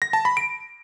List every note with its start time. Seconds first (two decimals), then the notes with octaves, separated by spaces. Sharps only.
0.02 A#6
0.13 A5
0.25 B5
0.37 D7